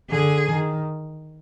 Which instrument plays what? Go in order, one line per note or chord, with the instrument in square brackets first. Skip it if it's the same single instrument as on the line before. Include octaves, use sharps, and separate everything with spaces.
[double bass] D3 [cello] G#4
[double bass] D#3